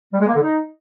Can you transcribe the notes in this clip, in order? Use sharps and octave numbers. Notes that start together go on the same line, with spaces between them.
G3
G#3
A#3
D3
D#4